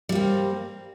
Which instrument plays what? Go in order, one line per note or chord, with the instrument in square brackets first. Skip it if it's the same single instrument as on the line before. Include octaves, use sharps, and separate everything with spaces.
[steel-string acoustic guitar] G3
A#3
C4